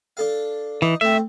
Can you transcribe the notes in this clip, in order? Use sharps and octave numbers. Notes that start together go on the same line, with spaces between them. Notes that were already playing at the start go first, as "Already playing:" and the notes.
D4 A4 F5
E3 D#4
A3 C4 E5